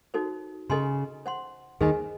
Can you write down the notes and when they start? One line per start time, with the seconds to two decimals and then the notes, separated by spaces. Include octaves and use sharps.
0.14 D#4 F#4 A4 C5
0.70 C#3 A4 D#5 G#5 C6
1.26 C5 F#5 C6
1.81 D#2 D#3 G#4 C5 D#5 G#5